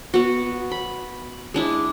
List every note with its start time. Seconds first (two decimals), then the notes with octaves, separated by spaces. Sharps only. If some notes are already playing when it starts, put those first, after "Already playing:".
0.14 B3 F#4
0.71 B5
1.54 G#3 D4 E4